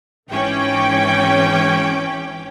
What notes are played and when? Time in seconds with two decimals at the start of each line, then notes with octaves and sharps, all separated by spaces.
0.30 G#1 E3 C#4 G5 D6